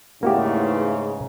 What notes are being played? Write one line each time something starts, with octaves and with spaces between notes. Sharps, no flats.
E2 G#2 C#3 A3 A#3 F#4 G4